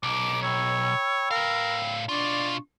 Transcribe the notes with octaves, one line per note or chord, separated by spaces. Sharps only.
B1 D6
C#5 G5 B5 E6
A2 A#4 F5
B2 D4 F4 D5 C#6